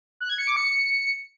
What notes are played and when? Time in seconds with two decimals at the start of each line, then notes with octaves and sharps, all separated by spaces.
0.20 F#6
0.29 G#6
0.38 C#7
0.47 D6
0.56 C#7